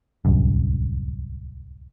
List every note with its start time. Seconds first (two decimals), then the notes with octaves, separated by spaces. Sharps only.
0.25 D1 C2 F#2